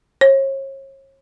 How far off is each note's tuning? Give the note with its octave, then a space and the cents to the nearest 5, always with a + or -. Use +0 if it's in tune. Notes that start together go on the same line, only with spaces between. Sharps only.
C#5 -40